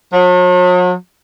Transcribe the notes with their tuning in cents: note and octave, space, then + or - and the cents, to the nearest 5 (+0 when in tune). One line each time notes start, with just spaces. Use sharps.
F#3 -45